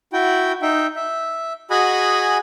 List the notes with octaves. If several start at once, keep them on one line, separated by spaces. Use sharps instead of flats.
E4 F#4 G5
D#4 E5 G5
E5
F#4 G#4 D#5 F#5 G#5 B5